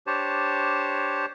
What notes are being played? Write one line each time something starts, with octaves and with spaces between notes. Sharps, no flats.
D4 G4 C5 C#5 A5